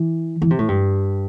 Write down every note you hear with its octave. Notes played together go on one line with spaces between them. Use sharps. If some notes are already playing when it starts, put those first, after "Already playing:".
Already playing: E3
E3
C3
A2
G2